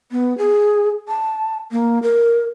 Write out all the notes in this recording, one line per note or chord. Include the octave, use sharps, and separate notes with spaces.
B3
G#4
A5
A#3
A#4